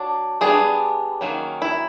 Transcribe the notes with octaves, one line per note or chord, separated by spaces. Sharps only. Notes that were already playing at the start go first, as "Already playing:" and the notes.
Already playing: F#3 D4
G3 B3 D4 G#4
D#3 F#3 A#3 C#4
E4